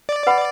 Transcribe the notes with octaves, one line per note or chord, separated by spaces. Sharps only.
D5
B4 F#5 B5